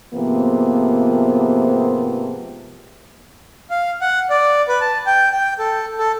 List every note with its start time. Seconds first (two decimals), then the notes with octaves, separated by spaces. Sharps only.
0.14 G#2 C3 F3 A#3 B3
3.70 F5
4.01 F#5
4.30 D5
4.68 B4
4.81 A5
5.06 G5
5.32 G5
5.59 A4
5.98 A4